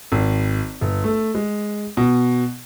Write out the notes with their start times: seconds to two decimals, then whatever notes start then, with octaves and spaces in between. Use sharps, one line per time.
0.12 G#1
0.81 G1
1.04 A3
1.35 G#3
1.97 B2